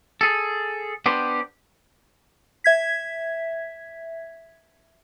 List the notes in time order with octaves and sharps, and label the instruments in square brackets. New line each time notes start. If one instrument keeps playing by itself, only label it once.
[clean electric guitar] G#4 A4
B3 D4 G4 C5
[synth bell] E5 G#6 B6